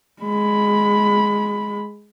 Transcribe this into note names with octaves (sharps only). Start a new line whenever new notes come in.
G#3 B5